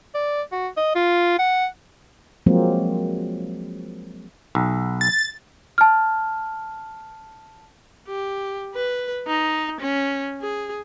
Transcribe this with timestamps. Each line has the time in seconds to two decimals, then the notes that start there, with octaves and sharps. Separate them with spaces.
0.14 D5
0.52 F#4
0.77 D#5
0.95 F4
1.39 F#5
2.46 F3 F#3 G#3 A#3 C4
4.55 B1
5.01 A6
5.78 A5 F6
8.08 G4
8.75 B4
9.28 D#4
9.81 C#4
10.41 G#4